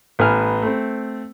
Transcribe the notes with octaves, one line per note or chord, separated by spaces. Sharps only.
A1 B3 G#5 F6
A3 C4